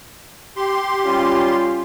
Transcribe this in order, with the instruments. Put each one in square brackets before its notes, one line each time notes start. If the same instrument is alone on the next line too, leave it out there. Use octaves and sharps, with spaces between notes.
[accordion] G4 C6
[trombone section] G3 C#4 F4